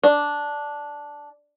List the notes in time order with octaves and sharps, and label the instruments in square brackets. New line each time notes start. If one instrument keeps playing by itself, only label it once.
[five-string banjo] D4